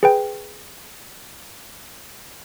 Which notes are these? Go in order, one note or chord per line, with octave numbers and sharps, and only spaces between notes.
G#4 B4 G5